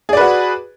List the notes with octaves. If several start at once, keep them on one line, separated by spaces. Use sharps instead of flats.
F#4 G#4 B4 D5